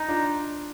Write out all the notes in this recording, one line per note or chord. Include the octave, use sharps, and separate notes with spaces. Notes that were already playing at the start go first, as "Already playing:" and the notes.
Already playing: D#4
D4 F4